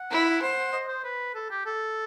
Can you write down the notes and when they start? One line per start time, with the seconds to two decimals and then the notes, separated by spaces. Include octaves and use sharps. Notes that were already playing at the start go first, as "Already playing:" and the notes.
Already playing: F#5
0.11 E4
0.42 C5
0.73 D#5
0.88 C5
1.04 B4
1.35 A4
1.51 G4
1.66 A4